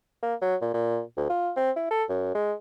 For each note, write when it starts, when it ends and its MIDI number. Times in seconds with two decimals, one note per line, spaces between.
0.23 0.35 58
0.41 0.56 54
0.61 0.70 46
0.74 1.01 46
1.17 1.25 38
1.29 1.51 65
1.56 1.71 60
1.76 1.87 64
1.91 2.04 69
2.09 2.34 42
2.35 2.54 56